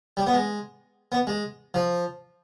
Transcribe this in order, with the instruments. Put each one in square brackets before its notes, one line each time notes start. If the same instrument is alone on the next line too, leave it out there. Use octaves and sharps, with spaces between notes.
[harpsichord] G3
B3
G#3
B3
G#3
F3